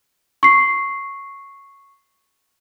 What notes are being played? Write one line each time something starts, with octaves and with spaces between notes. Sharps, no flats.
C#6 C7